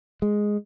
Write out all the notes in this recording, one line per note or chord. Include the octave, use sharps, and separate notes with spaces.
G#3